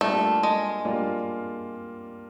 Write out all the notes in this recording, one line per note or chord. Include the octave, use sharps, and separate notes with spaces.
G3 A3 A#3 D4 F4
G#3
G3 A#3 D4 F4